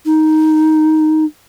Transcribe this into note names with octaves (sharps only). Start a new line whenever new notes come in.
D#4